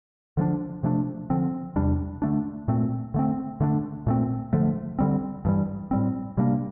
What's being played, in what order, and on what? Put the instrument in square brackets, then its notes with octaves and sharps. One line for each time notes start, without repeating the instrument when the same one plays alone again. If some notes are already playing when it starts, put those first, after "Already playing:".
[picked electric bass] D3 F3 A3 D4
C3 F3 A3 D4
D3 F3 C4
E2 C3 G3 D4
D3 A3 D4
A#2 A3 C4
D3 A3 C4
D3 A3 D4
A#2 A3 C4
D3 F3 A3
D3 G3 C4
G2 E3 G3
A2 G3 C4
C3 G3 A#3 D4